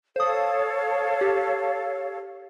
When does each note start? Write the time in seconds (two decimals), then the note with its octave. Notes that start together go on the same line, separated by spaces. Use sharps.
0.16 A4 C5 C#5 F5 D#6
1.21 G4